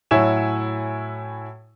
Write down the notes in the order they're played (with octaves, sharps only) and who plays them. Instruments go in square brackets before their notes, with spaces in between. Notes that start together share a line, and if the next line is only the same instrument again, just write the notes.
[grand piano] A2 F#3 E4 C#5 G#5 E7